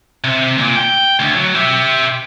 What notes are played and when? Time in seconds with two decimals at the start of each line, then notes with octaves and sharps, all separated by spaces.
0.24 C3
0.58 A#2
0.76 G5
1.20 D2
1.35 F#3
1.55 G4 E5